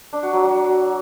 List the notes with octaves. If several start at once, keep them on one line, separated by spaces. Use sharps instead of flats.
D4
F#4
F#3
F#3